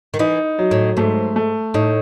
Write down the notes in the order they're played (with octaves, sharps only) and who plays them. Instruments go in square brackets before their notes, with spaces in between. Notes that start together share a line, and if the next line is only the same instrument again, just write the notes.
[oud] D#3
[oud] E3 [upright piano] D#4
[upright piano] F#3
[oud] A2
[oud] G#2 [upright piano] A3
[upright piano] A3
[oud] A2 [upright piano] D#4